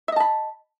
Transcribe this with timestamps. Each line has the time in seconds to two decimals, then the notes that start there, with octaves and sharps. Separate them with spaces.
0.08 E5
0.12 D#5
0.16 A5
0.20 B5